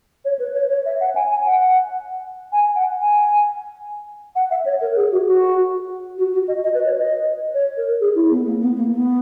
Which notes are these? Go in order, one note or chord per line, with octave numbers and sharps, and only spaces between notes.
C#5
B4
C#5
C#5
E5
F#5
G#5
G#5
F#5
G#5
F#5
G#5
F#5
E5
C#5
A#4
G#4
F#4
F#4
F#4
F#4
D#5
D#5
B4
C#5
D#5
C#5
A#4
G#4
E4
B3
A#3
B3
A#3
B3